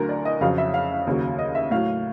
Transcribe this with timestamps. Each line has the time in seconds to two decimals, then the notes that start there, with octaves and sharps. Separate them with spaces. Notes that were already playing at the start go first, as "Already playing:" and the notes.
Already playing: D2 D3 F#3 A#4
0.09 D5
0.25 D#5
0.41 F2 C#3 F#3 F5
0.58 E5
0.74 F5
1.07 D#2 C#3 F#3
1.39 D#5
1.55 E5
1.71 A2 F#3 F5